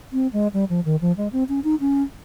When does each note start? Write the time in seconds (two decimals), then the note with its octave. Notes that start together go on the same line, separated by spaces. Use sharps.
0.13 C4
0.33 G#3
0.54 G3
0.69 F3
0.85 D#3
1.01 F3
1.17 G#3
1.33 C4
1.49 C#4
1.64 D#4
1.80 C#4